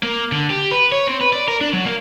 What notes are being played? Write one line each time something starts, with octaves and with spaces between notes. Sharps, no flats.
A#3
D3
G4
B4
C#5
C4
B4
D5
A#4
D4
F#3
A#3